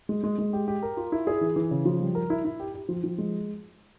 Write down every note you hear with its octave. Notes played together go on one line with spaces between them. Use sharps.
G#3
G#3
G#3
G4
G4
A#4
F4
E4
G#4
E3
E3
C#3
F3
G3
A#4
E4
E4
G4
G4
F3
F3
G#3